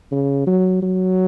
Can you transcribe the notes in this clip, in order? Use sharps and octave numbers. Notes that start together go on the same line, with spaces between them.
C#3
F#3
F#3